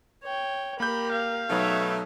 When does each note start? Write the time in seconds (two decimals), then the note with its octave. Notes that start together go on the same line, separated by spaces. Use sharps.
0.23 C#5 G5
0.80 A#3 G4 A#4 B5 G6
1.12 F5
1.50 B2 F#3 A3 D#4 B4 C#5 E5